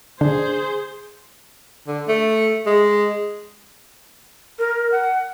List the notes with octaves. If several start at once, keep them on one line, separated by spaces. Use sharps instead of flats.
D3 D4 G#4 C5
D3
A3
G#3
A#4
F#5